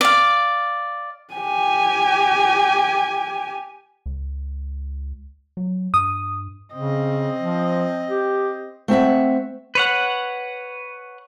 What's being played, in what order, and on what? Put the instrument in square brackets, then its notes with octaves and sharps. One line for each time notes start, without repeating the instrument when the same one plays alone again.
[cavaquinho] D5 F5
[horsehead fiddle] G4 G#5
[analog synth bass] C#2
F#3
[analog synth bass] G2 [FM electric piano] D#6
[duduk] C#3 [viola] C4 D#5
[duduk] F3
G4
[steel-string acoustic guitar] A3 C4 E5 F#5
[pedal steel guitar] B4 C#5 F#5